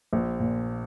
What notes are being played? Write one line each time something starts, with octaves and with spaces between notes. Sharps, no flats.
A#1
A#2